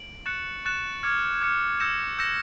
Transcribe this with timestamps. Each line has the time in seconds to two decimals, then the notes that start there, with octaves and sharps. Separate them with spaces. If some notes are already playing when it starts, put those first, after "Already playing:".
Already playing: D7 F#7
0.26 C#6 F#6 A6 C#7 E7
0.65 C#6 F#6 A6 C#7 E7
1.03 D6 F6 G#6 C#7
1.41 D6 F6 G#6 C#7
1.80 E6 G6 A#6 C#7 E7
2.19 E6 G6 A#6 C#7 E7